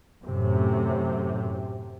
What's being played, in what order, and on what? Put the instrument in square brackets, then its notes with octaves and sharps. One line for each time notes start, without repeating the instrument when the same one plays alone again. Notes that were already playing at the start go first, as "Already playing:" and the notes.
[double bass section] F#2 A2 C3